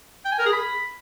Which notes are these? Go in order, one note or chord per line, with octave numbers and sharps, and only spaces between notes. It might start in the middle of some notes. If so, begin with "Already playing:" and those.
G5
G#5
A#4
G#4
B5